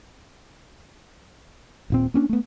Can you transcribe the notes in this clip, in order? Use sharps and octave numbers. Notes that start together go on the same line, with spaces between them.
D#1 A#2 C4
A#3 C#4 D4
A3 B3